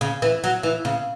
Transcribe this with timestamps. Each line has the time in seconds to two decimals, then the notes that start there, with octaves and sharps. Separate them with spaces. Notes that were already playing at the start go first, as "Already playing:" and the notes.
0.01 C#3
0.22 E3
0.44 F#3
0.63 E3
0.85 C#3